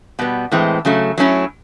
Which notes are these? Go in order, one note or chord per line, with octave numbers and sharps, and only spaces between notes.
B2 G3 B3
A2 E3 G#3 C4
C#3 F#3 A3
F#3 A3 C#4 E4